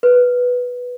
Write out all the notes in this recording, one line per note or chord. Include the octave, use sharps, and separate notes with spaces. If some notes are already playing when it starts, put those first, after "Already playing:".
B4